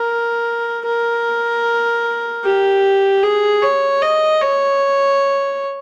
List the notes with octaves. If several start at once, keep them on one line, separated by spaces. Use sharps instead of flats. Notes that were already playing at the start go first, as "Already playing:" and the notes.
Already playing: A#4
A#4
G4
G#4
C#5
D#5
C#5